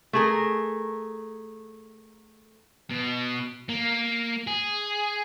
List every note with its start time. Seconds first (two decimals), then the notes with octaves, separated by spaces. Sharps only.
0.13 A3 G#4 A#4
2.91 B2
3.69 A#3
4.47 G#4